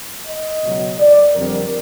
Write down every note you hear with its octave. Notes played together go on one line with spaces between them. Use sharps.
D#5
C#2 B2 F#3
D5
F2 D3 G3 C4 A#4